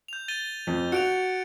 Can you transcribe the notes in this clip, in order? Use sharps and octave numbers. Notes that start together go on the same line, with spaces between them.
G6 F7
A6 D#7 G7
F2
F#4 C#7 D7 F7